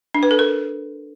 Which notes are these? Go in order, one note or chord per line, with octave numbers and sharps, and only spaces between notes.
D4
B4
A4
A#4